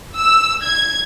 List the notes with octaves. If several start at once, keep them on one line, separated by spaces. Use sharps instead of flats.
E6
G#6